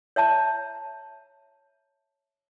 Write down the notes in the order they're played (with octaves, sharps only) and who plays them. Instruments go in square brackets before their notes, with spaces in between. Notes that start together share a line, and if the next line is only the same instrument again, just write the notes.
[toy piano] C#5 E5 A5 A#5